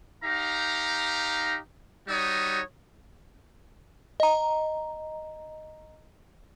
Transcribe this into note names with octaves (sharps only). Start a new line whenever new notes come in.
D#4 G4 F5 A#5
G3 D#4 F#4 C#5 D#6
D#5 A#5